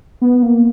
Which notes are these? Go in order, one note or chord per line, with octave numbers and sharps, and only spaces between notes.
B3
A#3